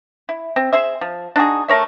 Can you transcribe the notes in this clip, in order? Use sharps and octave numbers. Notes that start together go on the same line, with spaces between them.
E4
C4
G#4 C5 E5
F3
D4 D#4 F#4 G#4
A3 A#4 C#5 E5